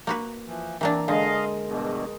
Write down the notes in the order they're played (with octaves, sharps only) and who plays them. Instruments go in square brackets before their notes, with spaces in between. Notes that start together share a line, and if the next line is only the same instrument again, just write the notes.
[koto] A#3 F#4 B4
[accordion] E3 F3
[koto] E3 A#3 D4 [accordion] C4 [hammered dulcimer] A#4
[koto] D3 [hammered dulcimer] G#3 [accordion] D#5 F5
[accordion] E2 G2 B2